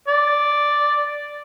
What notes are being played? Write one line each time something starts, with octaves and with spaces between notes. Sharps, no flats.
D5